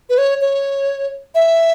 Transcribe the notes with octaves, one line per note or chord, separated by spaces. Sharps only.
B4
C#5
C#5
E5